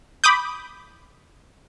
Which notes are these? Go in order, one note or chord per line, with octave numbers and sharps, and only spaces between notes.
B5 D6 D#6 G6